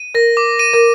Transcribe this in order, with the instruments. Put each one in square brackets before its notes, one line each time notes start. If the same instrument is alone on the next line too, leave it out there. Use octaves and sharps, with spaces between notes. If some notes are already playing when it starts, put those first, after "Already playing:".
Already playing: [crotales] D#7
[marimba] A#4 [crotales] A#6
[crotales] D6
D#7
[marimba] A#4